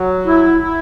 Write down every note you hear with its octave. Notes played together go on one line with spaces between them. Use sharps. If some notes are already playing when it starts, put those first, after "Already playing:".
Already playing: F#3
E4
E4